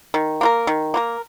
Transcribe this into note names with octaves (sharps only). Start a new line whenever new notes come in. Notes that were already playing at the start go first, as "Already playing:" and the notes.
D#3
A#3 F4 A#4
D#3
A#3 F4 A#4